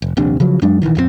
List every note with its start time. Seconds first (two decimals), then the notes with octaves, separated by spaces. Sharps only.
0.02 F1
0.17 D#1 A#1 C3 D4
0.40 C#3 F3 F#3
0.62 F#2 F#3 G#3 D4
0.82 A#1 D#2 D#3 E3
0.96 D#1 F2 F#3 C4